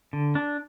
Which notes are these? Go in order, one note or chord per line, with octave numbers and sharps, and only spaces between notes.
D3
D4